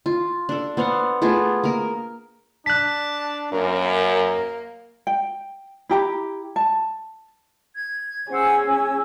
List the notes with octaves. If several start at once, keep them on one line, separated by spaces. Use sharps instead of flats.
F4
D4 A4
B3 C5 F5 F#5
A3 B3 F4 G#4
A#3 A#4
D4 A5 F#6 B6
F#2 A#3 A#4
G5
E4 G4 A#5
A5
G#6
C#4 G#4 C5 F#5 E6
E6